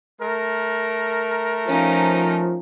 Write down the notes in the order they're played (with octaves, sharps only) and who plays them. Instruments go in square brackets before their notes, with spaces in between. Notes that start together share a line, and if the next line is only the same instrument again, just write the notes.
[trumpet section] A3 A#4
[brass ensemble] F3 [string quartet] C#4 D#4